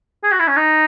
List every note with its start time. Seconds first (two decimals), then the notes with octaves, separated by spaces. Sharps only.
0.23 G#4
0.31 F#4
0.39 E4
0.48 C#4
0.56 D#4